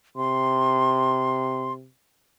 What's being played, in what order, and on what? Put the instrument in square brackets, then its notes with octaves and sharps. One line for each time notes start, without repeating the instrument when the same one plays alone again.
[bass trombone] C3 [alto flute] C6